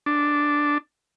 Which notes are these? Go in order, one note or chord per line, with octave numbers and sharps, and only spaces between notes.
D4